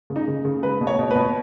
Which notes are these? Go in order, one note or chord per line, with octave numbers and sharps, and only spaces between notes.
C#3
D#4
C#3
C#3
G#3 B4
B2
C#5
B2
B4
B2